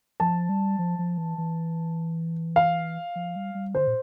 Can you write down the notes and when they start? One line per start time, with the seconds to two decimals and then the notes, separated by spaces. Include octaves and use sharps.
0.20 F3 A5
0.49 G3
0.79 F3
0.99 F3
1.18 E3
1.38 E3
2.56 F5
3.16 F3
3.36 G3
3.55 G3
3.75 D3 C5
3.87 A#2